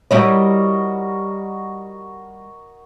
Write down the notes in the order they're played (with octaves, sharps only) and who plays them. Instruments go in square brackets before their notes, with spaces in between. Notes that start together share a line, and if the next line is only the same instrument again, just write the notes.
[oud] G3 E4 B4 [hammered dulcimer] F#4 A#4 D#5 [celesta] C#5